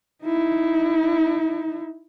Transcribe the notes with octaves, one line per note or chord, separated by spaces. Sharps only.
D#4 E4